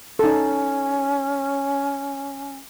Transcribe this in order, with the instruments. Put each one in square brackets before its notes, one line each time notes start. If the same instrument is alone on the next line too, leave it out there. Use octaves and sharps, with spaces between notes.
[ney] C#4 [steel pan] D#4 A4